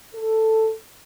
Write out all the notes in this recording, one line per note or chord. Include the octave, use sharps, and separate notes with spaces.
A4